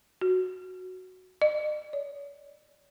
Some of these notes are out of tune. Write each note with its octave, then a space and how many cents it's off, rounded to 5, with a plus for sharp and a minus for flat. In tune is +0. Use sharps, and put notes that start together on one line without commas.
F#4 +0
D#5 -45
C#5 +40